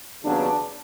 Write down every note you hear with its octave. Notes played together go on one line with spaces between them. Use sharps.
D#2 C#3 F#3 B3 D4